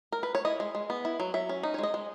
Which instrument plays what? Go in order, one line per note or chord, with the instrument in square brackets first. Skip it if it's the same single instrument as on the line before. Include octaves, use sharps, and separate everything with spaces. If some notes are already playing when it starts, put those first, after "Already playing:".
[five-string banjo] A#4
B4
C#5
E4 D#5
G#3
G#3
B3
E4
F#3
F#3 E5
C#4
D#4
C#5
G#3 D#5
G#3